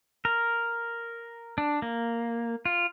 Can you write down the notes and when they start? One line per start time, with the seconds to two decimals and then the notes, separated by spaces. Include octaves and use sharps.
0.25 A#4
1.58 D4
1.82 A#3
2.65 F4